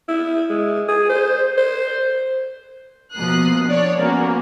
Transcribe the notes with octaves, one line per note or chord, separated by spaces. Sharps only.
E4
G#3
G#4
C5
C5
B2 F3 A#3 D#6 F#6 C7
D4 C#5 D5
F3 A#3 B3 C#4 F#4